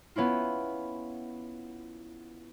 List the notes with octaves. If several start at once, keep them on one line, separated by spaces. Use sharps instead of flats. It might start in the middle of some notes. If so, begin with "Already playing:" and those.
B3 C#4 E4 F4